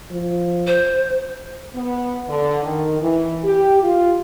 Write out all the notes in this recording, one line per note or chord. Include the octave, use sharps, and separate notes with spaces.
F3
C5
B3
D3
D#3
E3
G4
F4